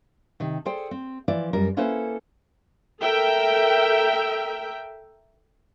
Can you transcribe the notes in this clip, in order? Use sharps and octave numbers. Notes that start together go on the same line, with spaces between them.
C3 D#3
G#4 A4 C5 D5 G5
C4
E3 F3 E4 D5
F#2 G3 A#4
A#3 C#4 E4 A4 B4 C5
A4 A#4 E5 G5